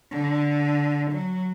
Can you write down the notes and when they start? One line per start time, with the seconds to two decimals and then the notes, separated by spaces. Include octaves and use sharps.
0.11 D3
1.12 F#3